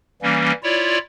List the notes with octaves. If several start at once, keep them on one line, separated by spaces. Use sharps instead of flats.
E3 G3 A#3 C#4
E4 F4 C#5 D5